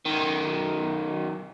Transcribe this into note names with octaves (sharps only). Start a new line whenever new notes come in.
B1 D#3